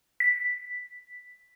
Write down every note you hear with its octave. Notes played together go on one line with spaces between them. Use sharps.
B6